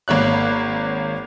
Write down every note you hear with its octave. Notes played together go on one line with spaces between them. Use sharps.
G#1 A#3 C#5 F#6